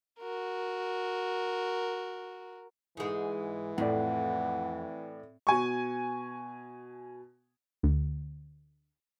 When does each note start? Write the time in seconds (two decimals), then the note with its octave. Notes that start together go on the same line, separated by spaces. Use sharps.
0.19 F#4 A#4
2.97 G#2 E3 G#3
3.78 F2 A2 D5 F#5
5.47 B2 G#5 C#6
7.83 D2